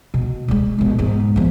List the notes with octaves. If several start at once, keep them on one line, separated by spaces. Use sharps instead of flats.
B2
G3 G#3
A#1 B2
E2 G#2
F3 B3